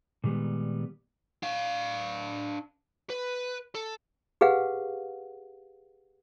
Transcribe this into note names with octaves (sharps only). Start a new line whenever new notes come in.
A#2 D#3 G3 G#3 B3
D4 F5
B4
A4
G4 G#4 B4 F5 F#5